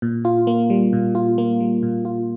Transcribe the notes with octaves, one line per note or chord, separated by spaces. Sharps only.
A#2
F4
A#3
G3
A#2
F4
A#3
G3
A#2
F4